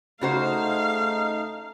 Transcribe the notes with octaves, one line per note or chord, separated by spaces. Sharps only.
C#3 A3 D#4 F#4 C5 F5